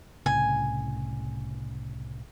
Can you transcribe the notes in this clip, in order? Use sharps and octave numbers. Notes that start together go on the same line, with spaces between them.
C2 A2 C#3 G#5